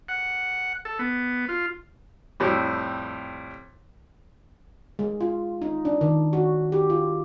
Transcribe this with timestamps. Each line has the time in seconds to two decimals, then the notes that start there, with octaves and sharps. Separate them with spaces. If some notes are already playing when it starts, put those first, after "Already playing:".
0.09 F#5
0.85 A4
0.99 B3
1.49 F4
2.40 F2 A2 G3
4.99 G#3
5.21 F4
5.62 D#4
5.85 D4
6.01 D#3
6.33 F#4
6.72 G4
6.90 F4